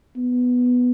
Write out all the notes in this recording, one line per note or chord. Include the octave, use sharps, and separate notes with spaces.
B3